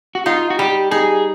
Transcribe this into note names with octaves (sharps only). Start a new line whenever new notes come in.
F#4
D#4 F4
F#4
G3 G4
D#4 G#4